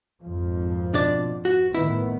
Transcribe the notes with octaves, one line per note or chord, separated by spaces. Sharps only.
G#1 F2 F3
B2 D4 D5
F#4
A2 D#3 B3 E4